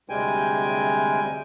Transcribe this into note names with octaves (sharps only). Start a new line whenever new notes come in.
D2 C3 G3 G#3 G5 G#5